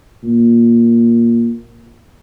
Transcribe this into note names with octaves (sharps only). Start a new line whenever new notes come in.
A#2